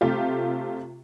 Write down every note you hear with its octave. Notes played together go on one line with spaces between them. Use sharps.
C3 A3 F4 G4